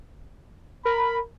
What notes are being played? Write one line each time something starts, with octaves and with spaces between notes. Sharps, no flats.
A#4 B5